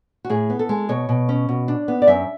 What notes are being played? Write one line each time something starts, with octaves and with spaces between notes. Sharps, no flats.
F#4
A2 G#4
B3
A4
G#3
B2 C#5
B2
C#4
B2
D4
B3
D5
F#2 E5